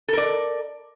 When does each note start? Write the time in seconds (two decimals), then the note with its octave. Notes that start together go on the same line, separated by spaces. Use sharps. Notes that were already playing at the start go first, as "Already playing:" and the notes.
0.08 A4
0.13 A#4
0.18 D5